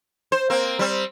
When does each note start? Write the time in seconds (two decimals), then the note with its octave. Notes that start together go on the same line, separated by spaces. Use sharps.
0.32 C5
0.50 A#3 C4
0.79 G3 C4